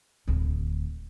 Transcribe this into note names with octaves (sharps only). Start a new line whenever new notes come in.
D1 D2